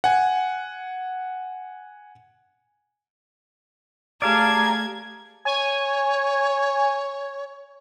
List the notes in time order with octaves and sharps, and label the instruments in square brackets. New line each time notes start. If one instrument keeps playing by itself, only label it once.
[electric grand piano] F#5 G#5
[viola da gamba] A3 G4 G#4 [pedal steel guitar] D5 F5 A5 [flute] A#5 [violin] G#6
[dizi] C#5 [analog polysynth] G#5